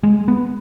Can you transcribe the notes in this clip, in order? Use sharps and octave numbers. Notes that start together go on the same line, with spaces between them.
G#3
B3